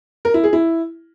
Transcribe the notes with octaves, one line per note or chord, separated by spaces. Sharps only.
A#4
E4
G#4
E4